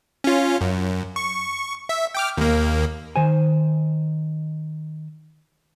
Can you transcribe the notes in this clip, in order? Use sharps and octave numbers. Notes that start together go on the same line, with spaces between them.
C#4 F4
F#2
C#6
E5
G5 D6 F6
D#2 A#3
D#3 C5 G#5